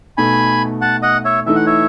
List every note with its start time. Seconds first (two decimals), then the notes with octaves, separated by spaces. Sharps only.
0.17 B2 A3 D#4 G#5 B5
0.81 F#5 A5
1.02 D#5 F#5
1.25 C#5 E5
1.46 E3 A3 D#4 E5
1.55 F#5
1.66 C#5 E5